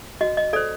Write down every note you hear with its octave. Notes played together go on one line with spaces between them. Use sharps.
F#4 D#5
D#5
A4 C5 D5